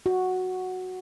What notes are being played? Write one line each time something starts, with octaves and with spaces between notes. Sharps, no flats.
F#4